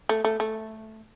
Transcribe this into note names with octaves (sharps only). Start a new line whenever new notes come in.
A3
A3
A3